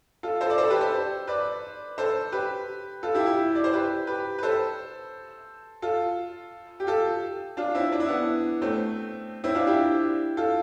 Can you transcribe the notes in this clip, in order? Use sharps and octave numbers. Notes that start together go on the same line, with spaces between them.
F4 A4
A4 C5
D5
A4 C5
G4 B4
A4 C5
B4 D5
A4 C5
G4 B4
F4 A4
E4 G4
E4 G4
D5
C5
G4 B4
G4 B4
B4
A4 C5
F4 A4
G4
F4 A4
D4 F4
C4 E4
D4
E4
B3 D4
A3 C4
C4 E4
D4 F4
E4 G4
F4 A4